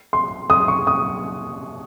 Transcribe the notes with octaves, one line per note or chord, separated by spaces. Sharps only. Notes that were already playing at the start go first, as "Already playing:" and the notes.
C6
D#6
C#6
D#6